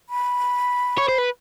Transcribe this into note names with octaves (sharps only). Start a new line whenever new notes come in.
B5
C#5
C5
B4